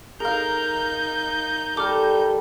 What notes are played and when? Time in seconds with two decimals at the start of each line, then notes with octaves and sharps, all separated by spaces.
0.20 D#4 G#4 A#4 F5 G6
1.77 G3 A4 D6 F6